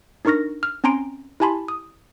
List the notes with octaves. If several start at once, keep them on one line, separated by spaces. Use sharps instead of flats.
D4 D#4 A#4 C#6 F6 A#6
F6
C4 C#4 G#5 A#5 C6 D7
E4 G4 G#5 A5 B5 C6
D#6